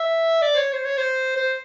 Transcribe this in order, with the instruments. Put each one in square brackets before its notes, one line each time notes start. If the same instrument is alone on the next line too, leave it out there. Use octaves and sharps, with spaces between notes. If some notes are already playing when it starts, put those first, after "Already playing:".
Already playing: [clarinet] E5
D5
C5
C#5
C5
C#5
C5
C5